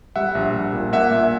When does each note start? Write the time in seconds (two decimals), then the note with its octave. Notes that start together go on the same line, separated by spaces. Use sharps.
0.16 G3 E5 F#5
0.35 A#1
0.54 A#1
0.73 A#2
0.92 A#3 E5 F#5
1.11 A#2